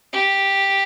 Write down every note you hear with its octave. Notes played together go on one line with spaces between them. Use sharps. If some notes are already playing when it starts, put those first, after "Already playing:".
G4